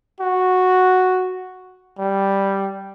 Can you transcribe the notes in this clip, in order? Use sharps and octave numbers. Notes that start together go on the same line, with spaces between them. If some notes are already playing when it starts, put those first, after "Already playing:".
F#4
G3